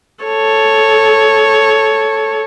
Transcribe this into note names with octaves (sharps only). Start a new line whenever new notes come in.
A4 C#5